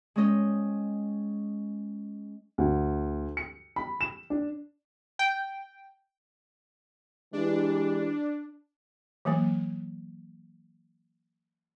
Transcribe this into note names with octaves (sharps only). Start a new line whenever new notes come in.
G#3 C4 C#4 D#5
D2
C#7
B5
E7
D4
G5
E3 G#3 D4 G4
E3 F#3 A#3